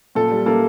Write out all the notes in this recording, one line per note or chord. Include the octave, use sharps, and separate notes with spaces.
A#2 A4
G3
A#3 A4